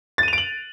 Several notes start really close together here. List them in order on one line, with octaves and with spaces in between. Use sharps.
A6 D#7 F7 D7 F#7